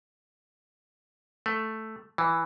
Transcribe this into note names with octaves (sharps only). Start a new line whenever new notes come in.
A3
E3